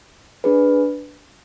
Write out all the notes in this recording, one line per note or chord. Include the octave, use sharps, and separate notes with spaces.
D4 G#4 B4